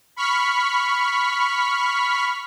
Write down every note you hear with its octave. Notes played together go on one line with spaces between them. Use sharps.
B5 C#6 F6 B6